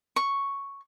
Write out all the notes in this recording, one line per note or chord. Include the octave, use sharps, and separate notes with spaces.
C#6